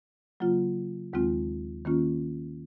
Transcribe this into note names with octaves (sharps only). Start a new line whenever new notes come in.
C#3 F#3 A#3 F4
D#2 D#3 G#3 C4 F4
D#3 A#3 C#4 F4